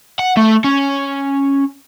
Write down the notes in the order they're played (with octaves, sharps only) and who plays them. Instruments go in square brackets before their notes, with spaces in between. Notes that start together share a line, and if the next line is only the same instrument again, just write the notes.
[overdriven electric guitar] F#5
A3
C#4